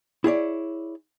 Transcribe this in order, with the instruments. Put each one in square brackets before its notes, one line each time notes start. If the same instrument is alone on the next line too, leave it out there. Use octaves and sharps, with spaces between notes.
[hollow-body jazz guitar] E4 G#4 C#5 D5